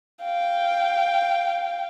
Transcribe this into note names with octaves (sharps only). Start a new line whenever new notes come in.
F5 G5